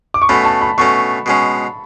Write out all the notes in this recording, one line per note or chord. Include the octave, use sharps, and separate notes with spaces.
D6
C#6
B2 A3 C#4 B5
A5
B5
B2 A3 C#4 C#6
B2 G#3 C#4